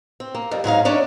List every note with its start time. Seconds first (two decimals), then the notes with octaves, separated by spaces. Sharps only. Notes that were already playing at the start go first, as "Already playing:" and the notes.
0.20 C4
0.35 A#3
0.51 F2 G3
0.64 G#2 F#3 D#4 F5
0.85 C#4 D4 C#5 D5